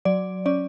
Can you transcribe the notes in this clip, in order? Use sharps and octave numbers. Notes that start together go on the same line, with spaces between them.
F#3 D5
C#4 D5